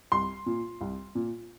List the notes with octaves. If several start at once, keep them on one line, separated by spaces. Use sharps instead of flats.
C2 C6
A#2
C2
A#2